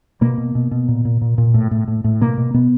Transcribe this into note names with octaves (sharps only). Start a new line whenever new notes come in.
B2 A#3
B2
B2
B2
A#2
A#2
A#2
A#2
A2
A2
A2
A2
B2 A#3
B2
B2 B3